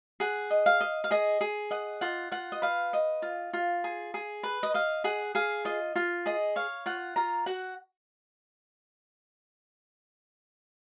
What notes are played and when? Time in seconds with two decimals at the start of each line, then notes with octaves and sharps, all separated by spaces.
0.20 G#4 F#5
0.50 D#5
0.66 F5
0.81 D#5
1.04 F5
1.11 G#4 D#5
1.41 G#4
1.71 D#5 F#5
2.01 F4 F#5
2.31 F4 F#5
2.52 D#5
2.62 B4 F5
2.93 D#5
3.22 F4
3.53 F4
3.84 G#4
4.14 G#4
4.43 B4
4.63 D#5
4.74 D#5 F5
5.04 G#4 F#5
5.35 G#4 F5
5.65 F4 D#5
5.96 F4
6.26 G#4 D#5
6.56 C#5 F5
6.86 F4 F#5
7.16 F4 A#5
7.46 F#4 F#5